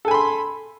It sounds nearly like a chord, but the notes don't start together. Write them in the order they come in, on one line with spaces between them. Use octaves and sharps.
A4 G#5 B5 C6